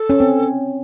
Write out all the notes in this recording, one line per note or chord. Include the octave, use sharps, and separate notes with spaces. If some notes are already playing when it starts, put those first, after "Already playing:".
Already playing: A4
C#4
C4